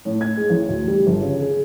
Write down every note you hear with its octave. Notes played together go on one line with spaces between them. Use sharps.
A2
G#6
G#3
A1
D2
G3
G1
C#3
G#4